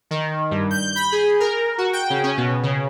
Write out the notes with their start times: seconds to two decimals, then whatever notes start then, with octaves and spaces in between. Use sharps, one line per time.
0.11 D#3
0.51 G2
0.71 G6
0.95 B5
1.12 G#4
1.40 A#4
1.78 F#4
1.93 G5
2.10 C#3
2.23 C#4
2.37 B2
2.63 C#3